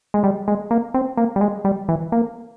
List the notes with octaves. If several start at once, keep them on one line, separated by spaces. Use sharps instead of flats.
G#3
G3
G#3
A#3
C4
A#3
G3
G#3
G3
E3
A#3